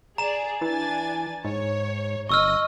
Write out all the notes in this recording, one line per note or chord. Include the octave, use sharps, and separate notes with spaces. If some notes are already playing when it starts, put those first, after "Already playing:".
G#4 D5 A#5 E7
E3 D4 G#5 A6
G#2 C#5
G1 D#5 C#6 E6 F6